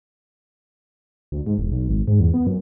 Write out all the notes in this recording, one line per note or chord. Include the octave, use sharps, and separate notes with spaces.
D2
G#2
E1
B1
G#1
G#2
E2
B3
F#2